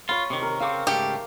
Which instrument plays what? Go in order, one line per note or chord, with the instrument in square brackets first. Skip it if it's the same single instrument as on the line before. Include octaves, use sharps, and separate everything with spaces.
[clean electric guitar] F4 [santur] C#5 B5
[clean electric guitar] C3 D#3
[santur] A#4
[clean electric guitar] C#3 C4 [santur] F5 C#6 D6
[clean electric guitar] G#2 C#3 A3 [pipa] G4